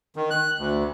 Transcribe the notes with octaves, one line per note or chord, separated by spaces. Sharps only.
D#3
F#6
D2